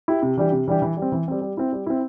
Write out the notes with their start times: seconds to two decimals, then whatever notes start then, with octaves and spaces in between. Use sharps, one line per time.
0.08 E4 G4
0.22 C3
0.37 E3 G3 D4 G4
0.52 C3
0.68 E3 G3 D4 G4
0.82 E3
0.97 G3
1.02 C4
1.12 E3
1.28 G3 C4
1.42 G3
1.57 C4 E4
1.73 G3
1.87 C4 E4